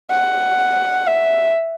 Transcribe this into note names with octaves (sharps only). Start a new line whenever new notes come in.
F#5
E5